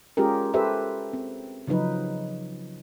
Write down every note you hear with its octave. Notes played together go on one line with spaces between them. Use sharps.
G#3 C#4 F4 G4 G#4 A#4
G4 A4 B4 C5 E5
C4
C#3 F3 F#3 D#4 B4